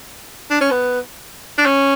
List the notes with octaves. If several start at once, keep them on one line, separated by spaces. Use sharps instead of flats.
D4
C#4
B3
D4
C#4